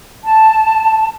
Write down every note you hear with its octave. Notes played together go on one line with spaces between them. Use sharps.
A5